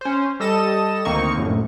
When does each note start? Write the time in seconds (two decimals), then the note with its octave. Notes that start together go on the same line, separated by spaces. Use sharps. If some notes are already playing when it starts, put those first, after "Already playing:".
0.01 C#4 C5
0.40 G3 A4 D#5 E7
1.05 D2 D#3 A#3 C4 D#4 C#6
1.37 A#1 F#2 A2